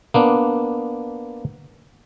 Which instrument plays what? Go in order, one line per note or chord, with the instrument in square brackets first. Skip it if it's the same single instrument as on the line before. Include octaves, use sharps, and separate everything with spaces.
[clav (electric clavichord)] A#3 B3 D4